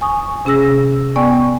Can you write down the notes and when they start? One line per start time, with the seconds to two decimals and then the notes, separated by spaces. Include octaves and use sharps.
0.01 G#5 C#6 D#6
0.45 C3 C#4 G#4 E6 A#6
1.16 B3 D5 G5 G#5 C#6